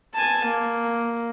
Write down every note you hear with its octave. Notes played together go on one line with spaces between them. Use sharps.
G#5 A5
A#3